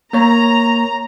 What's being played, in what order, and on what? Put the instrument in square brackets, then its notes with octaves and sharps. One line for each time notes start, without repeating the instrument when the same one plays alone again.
[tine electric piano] A#3 C#5 [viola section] A#5